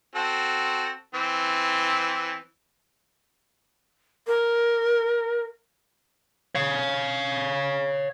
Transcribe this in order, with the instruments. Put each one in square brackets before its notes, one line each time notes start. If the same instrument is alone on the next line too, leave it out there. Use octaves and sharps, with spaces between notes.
[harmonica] C4 F#4 A4
E3 C4
[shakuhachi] A#4
[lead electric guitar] C#5 F5